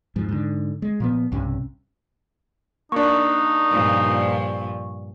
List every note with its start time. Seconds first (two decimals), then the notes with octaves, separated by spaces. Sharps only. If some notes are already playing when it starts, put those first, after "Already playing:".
0.16 G#2 F3
0.29 G#2 D3
0.82 G#3
1.00 A#2 F3 B3
1.32 B1 G2 C3 C#4
2.92 A#3 D4 D#4 C#6
3.71 G2 A#2 F3